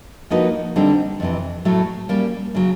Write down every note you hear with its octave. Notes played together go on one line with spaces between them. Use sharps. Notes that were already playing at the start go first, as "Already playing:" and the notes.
F3 A#3 D#4 F#4 B4
D3 G3 C4 D#4
F2 C3 E3
A2 F#3 A3
G3 A#3 C#4
C#3 F#3